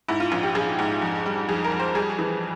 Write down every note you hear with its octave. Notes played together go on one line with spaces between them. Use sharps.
G#2 E4
F4
A#1 F4
G4
A#1 G#4
G#2
F2
G3
F2 G#4
A#4
F2
C5
G3 G#4
E3